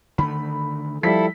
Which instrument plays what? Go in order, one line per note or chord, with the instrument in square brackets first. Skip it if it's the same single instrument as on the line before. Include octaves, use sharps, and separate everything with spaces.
[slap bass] D3 D#3 A3 [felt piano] B5
[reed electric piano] F3 G3 [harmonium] E4 A4 [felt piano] B6